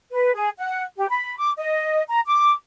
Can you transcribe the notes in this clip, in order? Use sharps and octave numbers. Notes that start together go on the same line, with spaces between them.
B4
G#4
F#5
G4
B5
D6
D#5
A#5
D6